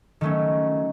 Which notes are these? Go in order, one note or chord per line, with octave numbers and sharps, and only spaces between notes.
D#3 F#3 A3 C#4